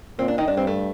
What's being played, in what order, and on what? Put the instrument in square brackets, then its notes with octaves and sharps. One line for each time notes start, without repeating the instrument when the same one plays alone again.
[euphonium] A#2 [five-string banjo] C4
[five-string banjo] D4
D#3 D#4
[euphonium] G2 [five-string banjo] D4
[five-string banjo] C4
A3